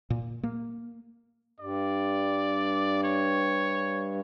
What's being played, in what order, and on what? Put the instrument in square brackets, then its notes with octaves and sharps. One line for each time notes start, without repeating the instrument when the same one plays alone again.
[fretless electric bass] A#2
A#3
[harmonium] G2 [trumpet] D5
[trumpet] C#5